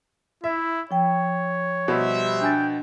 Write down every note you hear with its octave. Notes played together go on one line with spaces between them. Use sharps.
E4 E5
F3 C#5 G5
B2 G3 C5 E5
D4 G5 G#5 A6